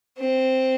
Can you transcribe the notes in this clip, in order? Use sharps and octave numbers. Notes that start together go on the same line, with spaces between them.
C4